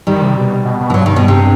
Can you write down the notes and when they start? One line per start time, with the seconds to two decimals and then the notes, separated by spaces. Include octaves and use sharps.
0.07 D#3 G3
0.22 C3
0.37 B2
0.65 B2
0.80 B2
0.90 E3
0.94 G2 F#3
1.06 D#3
1.16 B2
1.28 C3